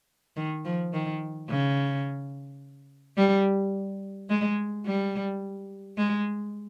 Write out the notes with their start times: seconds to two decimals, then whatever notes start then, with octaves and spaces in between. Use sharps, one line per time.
0.37 D#3
0.65 F3
0.93 D#3
1.49 C#3
3.17 G3
4.29 G#3
4.86 G3
5.97 G#3